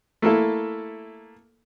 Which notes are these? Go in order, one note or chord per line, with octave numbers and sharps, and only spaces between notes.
A3 A#3 E4 A4